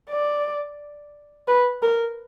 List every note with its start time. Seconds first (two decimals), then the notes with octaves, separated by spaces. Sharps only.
0.11 D5
1.48 B4
1.83 A#4